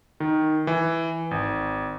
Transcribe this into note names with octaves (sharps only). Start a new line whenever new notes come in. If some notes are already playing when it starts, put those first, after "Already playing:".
D#3
E3
G#1